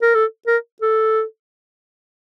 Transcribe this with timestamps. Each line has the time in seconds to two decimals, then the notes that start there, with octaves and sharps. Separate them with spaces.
0.02 A#4
0.15 A4
0.47 A#4
0.82 A4